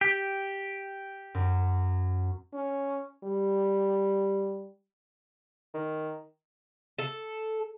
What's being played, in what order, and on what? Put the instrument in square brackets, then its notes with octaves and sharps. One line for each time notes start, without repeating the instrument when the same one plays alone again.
[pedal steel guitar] G4
[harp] F#2
[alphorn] C#4
G3
[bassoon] D#3
[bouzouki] A4